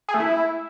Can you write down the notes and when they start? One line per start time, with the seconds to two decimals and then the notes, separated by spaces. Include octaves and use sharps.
0.08 G#4
0.14 A3
0.20 E4